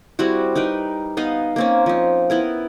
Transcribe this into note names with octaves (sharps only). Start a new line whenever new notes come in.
G3 C4 E4 F#4
D#4 A#4 B4 G5
B3 D#4 D#5 F5
A#3 C4 C#4
F3 D#4
B3 E4 A#4